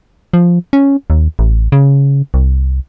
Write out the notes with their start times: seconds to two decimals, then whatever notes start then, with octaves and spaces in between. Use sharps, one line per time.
0.34 F3
0.73 C#4
1.10 D#2
1.39 A1
1.72 C#3
2.34 C2